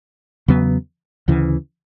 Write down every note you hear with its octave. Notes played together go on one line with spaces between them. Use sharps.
E2 C#3 F#3 B3
D2 C#3 E3